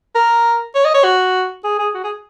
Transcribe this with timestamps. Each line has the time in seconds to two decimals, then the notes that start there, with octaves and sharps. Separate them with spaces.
0.15 A#4
0.75 C#5
0.85 D#5
0.94 C#5
1.04 F#4
1.64 G#4
1.79 G#4
1.94 F#4
2.04 G#4